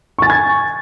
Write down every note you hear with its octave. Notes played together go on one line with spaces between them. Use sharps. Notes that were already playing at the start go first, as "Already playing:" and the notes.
G#5 C#6 G#6 A6